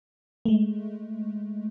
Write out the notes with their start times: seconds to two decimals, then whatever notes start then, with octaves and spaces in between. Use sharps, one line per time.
0.45 G#3 A3